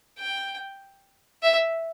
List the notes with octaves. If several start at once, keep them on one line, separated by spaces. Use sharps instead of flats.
G5
E5